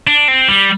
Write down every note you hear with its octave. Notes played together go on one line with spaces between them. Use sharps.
D4
C4
G3